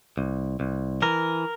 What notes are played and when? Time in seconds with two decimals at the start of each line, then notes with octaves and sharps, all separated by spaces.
0.18 C2
0.60 C2
1.02 E3 A#4